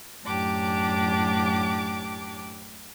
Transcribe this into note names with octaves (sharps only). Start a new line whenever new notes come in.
F#2 A2 D4 G4 D6